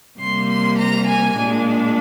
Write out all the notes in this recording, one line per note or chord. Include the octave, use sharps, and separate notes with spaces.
C3 G3 A#3 C6
C6
A#5
G#5
A#2 G#3 D4